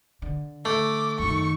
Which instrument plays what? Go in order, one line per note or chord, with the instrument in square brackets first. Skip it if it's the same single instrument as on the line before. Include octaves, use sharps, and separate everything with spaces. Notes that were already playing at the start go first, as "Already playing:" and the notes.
[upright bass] D3
[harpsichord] A3 [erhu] D6
[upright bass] F#2 D#3 [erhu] C#6